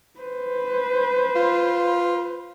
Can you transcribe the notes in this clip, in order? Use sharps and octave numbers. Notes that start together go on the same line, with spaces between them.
B4 C5
F4